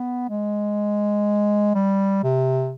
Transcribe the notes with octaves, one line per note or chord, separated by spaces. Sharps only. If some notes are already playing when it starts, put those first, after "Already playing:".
Already playing: B3
G#3
G3
C3